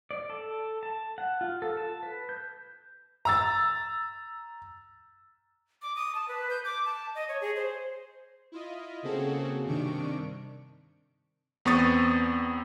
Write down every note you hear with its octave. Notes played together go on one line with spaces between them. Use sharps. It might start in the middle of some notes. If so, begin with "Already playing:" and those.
D5
A4
A5
F#5
F4
A4
A5
B4
G6
A#5 E6 A6
D6
D#6
A5
B4
G6
D6
A5
D#5
C#5
G#4
C5
E4 F4 D#5
C#3 A#3 C4 F#4 G#4 A4
G2 C3 D#3 D4 C#6 D7
E2 B3 C4 C#6 D#6 A6